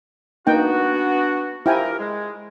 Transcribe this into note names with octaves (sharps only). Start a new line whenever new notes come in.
A#3 B3 D4 D#4 F#4 G5
F3 E4 G4 A#4 G5 G#5
G#3